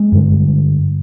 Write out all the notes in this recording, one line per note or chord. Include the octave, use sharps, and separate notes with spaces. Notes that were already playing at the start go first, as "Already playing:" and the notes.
Already playing: G#3
G2 D3